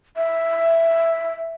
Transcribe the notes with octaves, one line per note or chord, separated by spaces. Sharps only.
E5